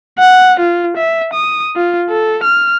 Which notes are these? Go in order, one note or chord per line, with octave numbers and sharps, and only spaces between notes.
F#5
F4
E5
D#6
F4
A4
F6